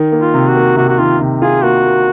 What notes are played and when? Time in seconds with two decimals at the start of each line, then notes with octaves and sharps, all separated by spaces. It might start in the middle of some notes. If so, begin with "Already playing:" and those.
Already playing: D#3
0.12 A#3
0.19 F4
0.34 C3
0.49 F#4
0.56 A#3
0.77 C3 F#4
0.89 F#4
0.98 D#3 F4
1.20 C3
1.42 F4 G#4
1.63 A#3 F#4
1.85 A#3